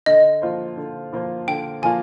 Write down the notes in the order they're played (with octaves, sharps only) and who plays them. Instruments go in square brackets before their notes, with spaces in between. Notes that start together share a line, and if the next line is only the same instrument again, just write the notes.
[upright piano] D3 [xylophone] D#5
[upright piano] F3 A#3 F4 C5
D3
F3 A#3 F4 C5
[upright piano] D3 [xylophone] G5
[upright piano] F3 A#3 F4 [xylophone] G#5